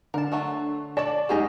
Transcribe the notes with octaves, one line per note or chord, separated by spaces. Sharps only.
D3 A#4 A5
F#3 A3 A4
A4 C#5 D5 A5
G#2 F#3 C#4 G4 G#4 D#5